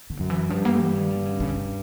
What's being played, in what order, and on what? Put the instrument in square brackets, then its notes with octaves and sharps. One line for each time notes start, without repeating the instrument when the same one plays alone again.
[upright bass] D3
[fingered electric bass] F#2
[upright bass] E3
[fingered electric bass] G2 [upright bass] F3
[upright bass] A#3
E3
D#3
D3
C#3
C#3
C#3